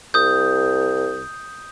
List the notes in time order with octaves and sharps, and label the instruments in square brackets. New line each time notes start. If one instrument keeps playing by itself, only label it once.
[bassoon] C2 [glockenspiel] D#6 G6